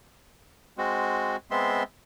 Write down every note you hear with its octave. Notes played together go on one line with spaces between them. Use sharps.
G#3 C4 F#4
G#3 B3 C4 E5 C6